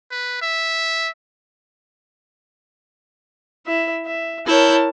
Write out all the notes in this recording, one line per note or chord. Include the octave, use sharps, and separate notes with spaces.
B4
E5
E4 E5
E5
E4 A#4 C#5 A5 G6